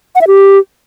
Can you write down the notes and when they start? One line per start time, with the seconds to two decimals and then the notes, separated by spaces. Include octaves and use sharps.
0.15 F#5
0.21 E5
0.27 G4